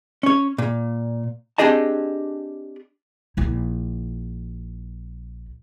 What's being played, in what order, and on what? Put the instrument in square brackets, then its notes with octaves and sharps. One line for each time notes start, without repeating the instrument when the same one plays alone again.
[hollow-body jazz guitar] C#4 C#5
A#2
C4 D4 G4 G#4 D#5 A5
[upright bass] A#1 E4